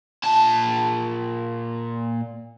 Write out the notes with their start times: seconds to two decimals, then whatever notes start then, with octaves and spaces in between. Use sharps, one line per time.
0.24 A#2 A5